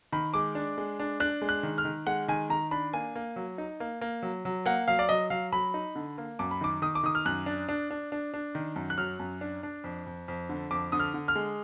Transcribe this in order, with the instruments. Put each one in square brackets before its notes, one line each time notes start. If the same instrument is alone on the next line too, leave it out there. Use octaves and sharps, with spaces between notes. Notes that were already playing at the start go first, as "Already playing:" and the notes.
[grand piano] D#3 B5
G#3 D6
D4
G#3
D4
D4 F#6
G#3
F#6
D#3
F6
D#3
G#3 F#5
D#3 G#5
D#3 A#5
D4 B5
A#3 G#5
A#3
F#3
D#4
A#3
A#3
F#3
F#3
A#3 F#5
F#3 F5
D5
F#3 D#5
F#3 F5
F#3 B5
D#4
D3
A#3
F#2 D6
B5
D#3 D6
D#3 D#6
D6
D#3 D#6
F6
F#2 F#6
D4
D4
D4
D4
D4
D#3
F#2
F#6
F#3 F6
F#2
D4
D4
F2
F2
F2
D3
F2 D6
D3 D#6
F6
D3
F6
G#3